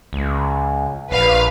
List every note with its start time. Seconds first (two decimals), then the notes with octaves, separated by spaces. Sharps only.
0.13 C#2
1.11 A#1 B4 F5